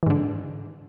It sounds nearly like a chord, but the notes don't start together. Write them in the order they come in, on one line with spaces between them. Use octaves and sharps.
E3 G#2 D3